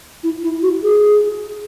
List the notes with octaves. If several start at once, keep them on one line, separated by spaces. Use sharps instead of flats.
E4
E4
F#4
G#4